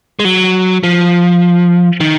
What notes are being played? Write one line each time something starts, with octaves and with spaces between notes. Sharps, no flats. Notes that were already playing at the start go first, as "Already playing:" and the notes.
G#3
F#3
F3
D#3